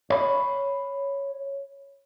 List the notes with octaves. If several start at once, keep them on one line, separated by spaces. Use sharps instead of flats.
C#5 B5